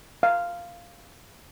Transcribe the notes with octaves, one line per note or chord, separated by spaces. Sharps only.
F5